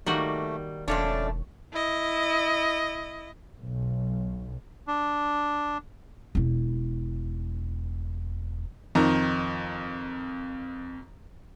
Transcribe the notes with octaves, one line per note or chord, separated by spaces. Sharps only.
D#3 G3 A3 A#3 F#4
E1 F2 A3 C#4 D4 C#5 D5
E4 D#5
B1
D4
E1 E4
F2 D#3 A#5